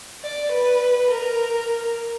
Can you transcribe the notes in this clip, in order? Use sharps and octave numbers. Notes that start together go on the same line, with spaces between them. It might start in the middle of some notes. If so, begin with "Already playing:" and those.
D5
B4
A#4